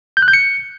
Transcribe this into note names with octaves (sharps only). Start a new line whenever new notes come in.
G6
F#6
G6
C#7